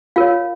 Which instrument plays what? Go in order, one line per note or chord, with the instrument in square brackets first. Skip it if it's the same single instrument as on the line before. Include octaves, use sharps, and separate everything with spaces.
[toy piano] F4 A#4 C#5 F5